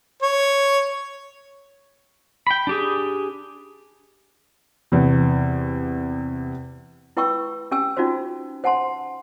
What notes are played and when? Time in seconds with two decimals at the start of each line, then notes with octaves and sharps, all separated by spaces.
0.22 C#5
2.47 G5 B5
2.67 D4 G4 G#4
4.92 E2 C3
7.17 E4 B4 G5 B5 C#6 E6
7.71 C#4 G4 G5 G#5 E6
7.97 C#4 D#4 F4 F#4 C5
8.64 C5 F#5 G#5 A5 C6